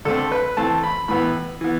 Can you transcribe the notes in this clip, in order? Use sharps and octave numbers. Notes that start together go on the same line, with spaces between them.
D3 A3 C4 A4
B4
E3 A3 C4 A5
B5
A2 E3 B3 B5
E3 B3